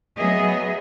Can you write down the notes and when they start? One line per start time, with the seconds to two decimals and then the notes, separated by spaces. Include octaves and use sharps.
0.17 F#3 B3 G#4 D#5 E5